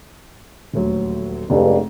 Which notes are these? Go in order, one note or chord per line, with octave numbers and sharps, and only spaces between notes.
D#1 D2 F#3
F1 C#2 G2 A4 B4